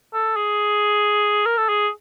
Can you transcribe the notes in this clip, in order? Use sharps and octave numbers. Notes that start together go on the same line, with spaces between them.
A4
G#4
A#4
A4
G#4